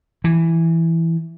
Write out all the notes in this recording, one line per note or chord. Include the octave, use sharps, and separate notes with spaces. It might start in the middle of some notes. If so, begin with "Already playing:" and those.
E3